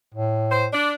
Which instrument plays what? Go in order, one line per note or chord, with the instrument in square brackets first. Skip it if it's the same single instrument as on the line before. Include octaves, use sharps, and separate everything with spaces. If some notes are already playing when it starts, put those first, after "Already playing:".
[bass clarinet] A2
[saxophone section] C5
D4